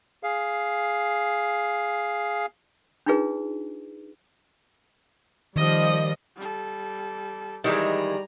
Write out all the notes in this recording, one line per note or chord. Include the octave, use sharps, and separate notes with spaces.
G#4 F5
D4 D#4 F4 G#4 B4
D#3 F3 G3 D#5
G3 A4
D#3 E3 G3 G#3 G#4 A#5